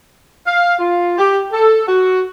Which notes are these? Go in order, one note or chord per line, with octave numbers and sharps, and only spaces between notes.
F5
F4
G4
A4
F#4